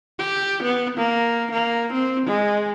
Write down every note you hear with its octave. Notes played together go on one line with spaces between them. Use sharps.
G4
B3
A#3
A#3
C4
G#3